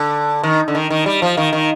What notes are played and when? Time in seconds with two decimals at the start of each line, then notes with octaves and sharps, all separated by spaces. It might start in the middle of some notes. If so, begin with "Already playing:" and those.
Already playing: D3
0.43 D#3
0.68 D3
0.75 D#3
0.90 D#3
1.06 G3
1.22 F3
1.37 D#3
1.53 D#3